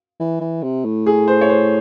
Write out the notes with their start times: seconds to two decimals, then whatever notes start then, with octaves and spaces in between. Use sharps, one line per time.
0.20 E3
0.41 E3
0.62 C3
0.85 A2
1.06 G#4
1.28 C5
1.41 C#5
1.49 C5